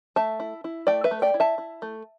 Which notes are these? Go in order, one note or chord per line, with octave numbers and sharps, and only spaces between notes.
A3 E5 A5
E4
E4
A3 D5 G5
B4 E5
A3
D5 G5
E4
E5 A5
E4
A3